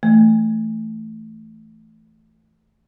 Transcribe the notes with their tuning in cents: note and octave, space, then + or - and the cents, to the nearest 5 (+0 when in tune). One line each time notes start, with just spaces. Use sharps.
E3 +5 A3 +0